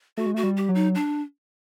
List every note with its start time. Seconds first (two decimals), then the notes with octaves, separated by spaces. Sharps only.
0.17 A3 F#4
0.26 G#3
0.34 A3 F#4
0.43 G3
0.57 G4
0.69 F#3
0.75 D#4
0.95 D4